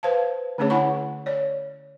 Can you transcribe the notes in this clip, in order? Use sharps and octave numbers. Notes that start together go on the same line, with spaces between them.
B4 C5 F5 A5
D3 A3 C#4 D4 G#4 C#5
E4 F#5 G#5 B5 C#6
C#5 D5